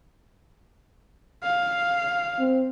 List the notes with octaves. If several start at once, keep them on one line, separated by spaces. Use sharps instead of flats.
F5
C4